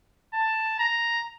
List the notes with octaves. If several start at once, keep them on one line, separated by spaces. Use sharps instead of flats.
A5
A#5